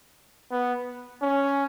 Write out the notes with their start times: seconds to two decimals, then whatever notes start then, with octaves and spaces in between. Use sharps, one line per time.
0.52 B3
1.22 C#4